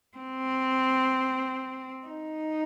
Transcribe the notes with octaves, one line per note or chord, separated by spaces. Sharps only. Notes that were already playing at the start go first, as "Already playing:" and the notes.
C4
D#4